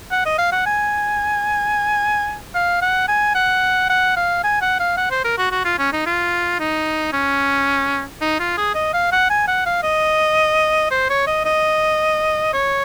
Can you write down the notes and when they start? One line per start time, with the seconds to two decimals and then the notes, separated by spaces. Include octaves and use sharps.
0.11 F#5
0.25 D#5
0.38 F5
0.52 F#5
0.66 G#5
2.54 F5
2.81 F#5
3.08 G#5
3.35 F#5
3.89 F#5
4.16 F5
4.44 G#5
4.61 F#5
4.80 F5
4.97 F#5
5.11 C5
5.24 A#4
5.38 F#4
5.51 F#4
5.65 F4
5.78 C#4
5.92 D#4
6.06 F4
6.59 D#4
7.13 C#4
8.21 D#4
8.39 F4
8.57 G#4
8.75 D#5
8.93 F5
9.12 F#5
9.30 G#5
9.47 F#5
9.66 F5
9.83 D#5
10.91 C5
11.09 C#5
11.27 D#5
11.45 D#5
12.53 C#5